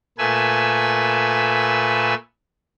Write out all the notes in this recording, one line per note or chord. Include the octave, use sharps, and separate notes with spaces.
A#2 A3 B4 G#5 E6